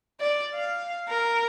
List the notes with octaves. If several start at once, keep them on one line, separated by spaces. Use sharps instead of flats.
D5
F5
A#4